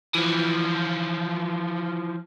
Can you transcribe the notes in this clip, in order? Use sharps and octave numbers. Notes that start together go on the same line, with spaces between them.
E3 F3